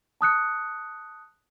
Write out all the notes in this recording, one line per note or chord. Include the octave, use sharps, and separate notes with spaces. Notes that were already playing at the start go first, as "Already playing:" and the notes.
A5 D#6 F#6 C#7